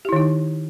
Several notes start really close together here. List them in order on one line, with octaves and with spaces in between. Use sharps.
G4 E4 D#3 D#4